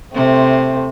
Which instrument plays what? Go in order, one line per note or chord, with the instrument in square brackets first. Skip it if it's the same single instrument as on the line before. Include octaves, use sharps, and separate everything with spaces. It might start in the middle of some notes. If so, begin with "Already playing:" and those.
[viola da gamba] C3 [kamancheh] A3 C4